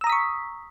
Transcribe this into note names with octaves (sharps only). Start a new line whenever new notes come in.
A#5 C#6 D#6 E6 B6